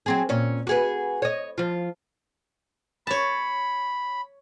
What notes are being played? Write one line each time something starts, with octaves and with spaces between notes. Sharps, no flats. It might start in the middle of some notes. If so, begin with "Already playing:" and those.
F#3 C4 G#4
A#2 C#4
F#4 G#4 B4
C#5 D#5
F3 F4
C#5 A5 B5